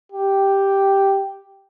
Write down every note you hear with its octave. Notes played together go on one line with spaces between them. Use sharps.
G4